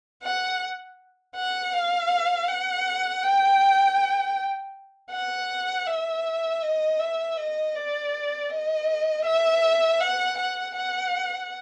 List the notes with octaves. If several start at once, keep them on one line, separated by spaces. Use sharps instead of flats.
F#5
F#5
F5
F#5
G5
F#5
E5
D#5
E5
D#5
D5
D#5
E5
F#5
F#5
F#5